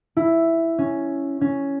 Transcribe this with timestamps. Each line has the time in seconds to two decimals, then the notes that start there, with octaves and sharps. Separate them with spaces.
0.17 E4
0.78 C#4
1.41 C#4